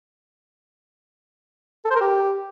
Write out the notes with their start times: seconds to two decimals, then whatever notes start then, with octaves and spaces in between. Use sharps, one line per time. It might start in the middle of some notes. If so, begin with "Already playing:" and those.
1.85 A4
1.90 C5
1.95 A#4
2.01 G4